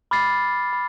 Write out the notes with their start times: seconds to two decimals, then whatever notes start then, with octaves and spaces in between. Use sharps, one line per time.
0.11 B5 D6 F6 A6 C7
0.73 B5